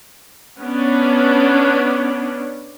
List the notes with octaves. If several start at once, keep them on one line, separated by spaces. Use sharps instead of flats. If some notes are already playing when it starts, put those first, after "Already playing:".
B3 C#4 D4